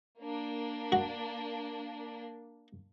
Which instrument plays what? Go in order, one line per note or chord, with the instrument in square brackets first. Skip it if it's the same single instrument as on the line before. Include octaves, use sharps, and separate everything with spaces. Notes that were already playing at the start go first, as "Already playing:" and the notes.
[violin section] A#3 D4
[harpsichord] F#4